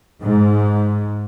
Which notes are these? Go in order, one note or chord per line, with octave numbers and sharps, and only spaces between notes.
G#2